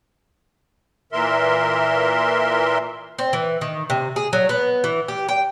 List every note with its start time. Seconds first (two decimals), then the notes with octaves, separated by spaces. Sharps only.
1.12 A#2 E3 A#4 E5 C6
3.18 C4
3.33 E3
3.61 D#3
3.90 C3
4.16 G#4
4.33 F#3
4.49 B3
4.84 E3
5.08 G4
5.29 G5